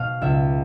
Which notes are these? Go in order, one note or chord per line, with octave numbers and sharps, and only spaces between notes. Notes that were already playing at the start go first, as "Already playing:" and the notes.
Already playing: B2 F5
C#2 E5